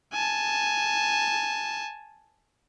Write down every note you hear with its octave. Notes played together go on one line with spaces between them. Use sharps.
G#5 A5